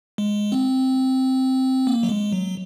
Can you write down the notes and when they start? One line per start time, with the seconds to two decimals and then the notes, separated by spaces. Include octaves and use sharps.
0.18 G#3
0.52 C4
1.87 A#3
2.03 F#3
2.09 G#3
2.32 F#3